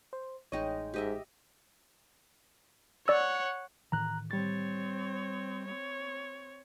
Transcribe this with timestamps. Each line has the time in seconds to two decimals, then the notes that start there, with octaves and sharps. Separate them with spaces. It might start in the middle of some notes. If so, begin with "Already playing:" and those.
0.13 C5
0.52 A1 G#3 D#4 C#5 D#5 G5
0.94 G#2 G4 D#5 E5
3.08 C#5 D5 F#5 E6
3.92 A2 D#3 E3 A#5 F#6
4.31 G3 C4 C#5 A6
5.65 C4 C#5